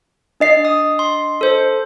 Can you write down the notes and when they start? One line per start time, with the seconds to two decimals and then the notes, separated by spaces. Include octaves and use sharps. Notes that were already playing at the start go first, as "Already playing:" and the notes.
0.40 D4 D#5 C7
0.65 D#6
0.99 C6
1.41 A4 C5